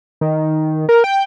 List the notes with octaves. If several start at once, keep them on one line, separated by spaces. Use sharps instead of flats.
D#3
A#4
G5